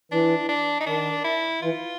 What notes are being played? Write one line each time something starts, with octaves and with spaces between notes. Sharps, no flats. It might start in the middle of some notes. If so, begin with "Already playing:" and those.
E3 D4
D4
D#4
D#3 D4
E4
E3 F4